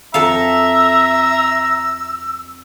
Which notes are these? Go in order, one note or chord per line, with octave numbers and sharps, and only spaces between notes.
F2 A4 E5 F5 A#5 E6